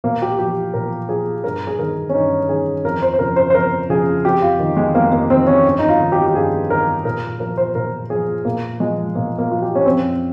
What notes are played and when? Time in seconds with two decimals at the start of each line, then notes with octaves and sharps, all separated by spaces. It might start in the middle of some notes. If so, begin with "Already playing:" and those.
0.04 A#2 A#3
0.22 G4
0.39 F3 G4
0.74 A#2 A#4
1.08 F3 G#4
1.44 G2 A#4
1.67 G#4
1.79 D#3 A#4
2.09 C#4
2.14 G2 D#4
2.49 D#3 G#4
2.84 F2 A#4
3.02 C5
3.14 C5
3.19 C#3 F3 A#4
3.36 C5
3.50 C5
3.55 F2 A#4
3.89 C#3 F3 G#4
4.24 F2 G4
4.42 F4
4.59 D#3
4.77 G#3
4.95 F2 A#3
5.12 A#3
5.30 D#3 C4
5.47 C#4
5.65 G2
5.79 D#4
5.89 F4
6.00 D#3
6.12 G4
6.26 G4
6.35 G2 G#4
6.70 D#3 A#4
7.05 A#2 A#4
7.40 F3 A#4
7.57 C5
7.75 A#2 A#4
8.10 F3 G#4
8.45 A#2 A#3
8.80 F3 G#3
9.15 A#2 A#3
9.38 A#3
9.50 F3 F4
9.62 G4
9.75 C#4
9.86 F2 C4